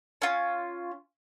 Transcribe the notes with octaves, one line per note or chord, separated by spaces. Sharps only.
C#4 F4